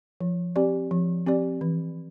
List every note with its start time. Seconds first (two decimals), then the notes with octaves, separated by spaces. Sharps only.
0.21 F3
0.56 C4 G4 D5
0.91 F3
1.26 C4 G4 D5
1.61 E3